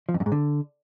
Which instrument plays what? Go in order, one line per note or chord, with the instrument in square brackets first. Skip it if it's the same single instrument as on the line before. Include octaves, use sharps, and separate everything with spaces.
[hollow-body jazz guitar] F3
F2
F#2
G#2
D3